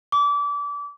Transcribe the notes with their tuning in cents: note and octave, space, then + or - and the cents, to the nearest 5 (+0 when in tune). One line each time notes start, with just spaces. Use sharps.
D6 -30